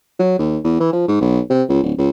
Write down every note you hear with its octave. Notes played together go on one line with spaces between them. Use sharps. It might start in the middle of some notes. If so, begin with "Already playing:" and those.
F#3
D#2
E2
E3
F3
G#2
B1
C3
C#2
D1
C#2